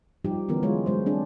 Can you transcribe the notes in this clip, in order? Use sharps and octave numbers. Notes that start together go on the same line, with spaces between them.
F3 G3 D#4 G4
D3 E3 B3 C#4 A#4
F#3 G#3 F4 C#5
F#3 G#3 C5
C4 D4 G#4 A4